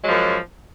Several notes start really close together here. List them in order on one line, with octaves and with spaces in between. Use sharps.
G#3 F#3 F3 F#2